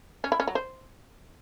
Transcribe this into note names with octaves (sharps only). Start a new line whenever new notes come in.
C#4
E4
C#4
F#3
C5